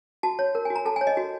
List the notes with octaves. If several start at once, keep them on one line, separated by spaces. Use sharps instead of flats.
F#4 A5
C#5
A#4
G#5
F#4
A#5
A4 A5
G#5
C#5
D#5
F#4